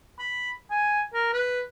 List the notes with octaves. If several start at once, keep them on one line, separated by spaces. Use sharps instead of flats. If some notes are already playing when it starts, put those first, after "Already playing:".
B5
G#5
A#4
B4